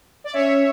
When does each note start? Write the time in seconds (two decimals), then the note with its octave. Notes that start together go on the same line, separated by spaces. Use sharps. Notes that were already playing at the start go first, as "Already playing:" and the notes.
0.24 D5
0.33 C#4 C#5 E5